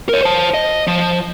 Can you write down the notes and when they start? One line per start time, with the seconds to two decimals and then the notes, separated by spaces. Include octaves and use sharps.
0.09 A#4 C#5
0.22 C5 A5
0.54 D#5
0.88 F3